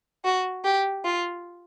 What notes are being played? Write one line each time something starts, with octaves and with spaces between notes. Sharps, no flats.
F#4
G4
F4